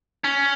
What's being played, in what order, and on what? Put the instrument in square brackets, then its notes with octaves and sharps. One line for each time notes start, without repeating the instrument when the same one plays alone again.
[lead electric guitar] C#4